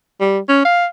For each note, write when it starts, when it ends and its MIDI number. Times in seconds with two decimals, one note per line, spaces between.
0.20 0.39 55
0.49 0.62 61
0.65 0.86 77